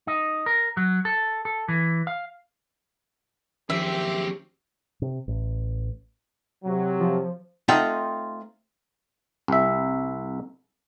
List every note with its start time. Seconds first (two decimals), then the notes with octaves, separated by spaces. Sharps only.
0.07 D#4
0.46 A#4
0.77 F#3
1.05 A4
1.45 A4
1.68 E3
2.07 F5
3.70 F#1 D#3 F3 C4 C#4 G4 E5
5.02 C3
5.28 A1
6.64 C3 F#3
7.00 F3
7.68 A3 C4 D#4 F4 F#5 G5
9.48 C2 E5